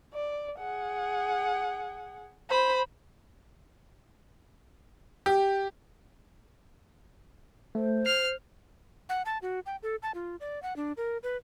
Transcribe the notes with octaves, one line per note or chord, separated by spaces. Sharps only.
D5
G#4 F#5
C5 B5
G4
A3 C5
F6 C7
F#5
A5
F#4
G5
A4
A5
F4
D5
F#5
D4
A#4
B4